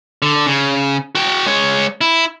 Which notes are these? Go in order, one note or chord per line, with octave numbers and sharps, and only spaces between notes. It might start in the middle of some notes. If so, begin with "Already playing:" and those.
D3
C#3
F#4 G5
G#3 C#5
E4